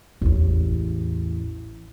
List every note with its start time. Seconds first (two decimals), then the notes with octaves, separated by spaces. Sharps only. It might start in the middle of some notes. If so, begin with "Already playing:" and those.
0.21 A1 E2